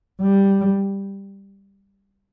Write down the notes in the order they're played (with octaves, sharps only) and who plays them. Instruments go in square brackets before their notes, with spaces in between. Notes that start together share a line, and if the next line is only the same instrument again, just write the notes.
[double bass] G3